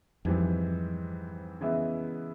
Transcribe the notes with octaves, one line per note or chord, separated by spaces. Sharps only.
F2 G#2 E3 G3 C4
C#3 E3 G#3 B3 E4